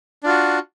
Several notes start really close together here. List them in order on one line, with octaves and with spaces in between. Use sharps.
D4 F4 F#4